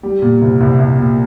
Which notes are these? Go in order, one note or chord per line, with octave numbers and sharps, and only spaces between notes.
G3
A#2
C2
C2
C2
A#2